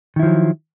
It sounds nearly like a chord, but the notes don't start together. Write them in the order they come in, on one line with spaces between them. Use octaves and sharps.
D#3 E4 F3 F#3